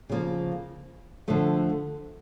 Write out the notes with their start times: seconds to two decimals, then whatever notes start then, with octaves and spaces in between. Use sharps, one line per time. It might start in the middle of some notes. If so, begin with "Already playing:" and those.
0.09 C#3 F3 A#3
1.28 D3 F3 A3